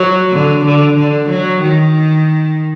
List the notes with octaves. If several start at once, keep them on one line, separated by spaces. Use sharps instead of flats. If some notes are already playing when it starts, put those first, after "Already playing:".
Already playing: F#3
D3
D3
D3
F#3
D#3